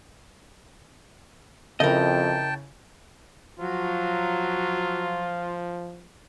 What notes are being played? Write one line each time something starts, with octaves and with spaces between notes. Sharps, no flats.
F2 C#3 E4 A#4 D#5 G5 A5
F3 F#3 F4